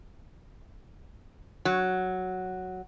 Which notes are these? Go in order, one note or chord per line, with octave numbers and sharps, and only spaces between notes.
F#3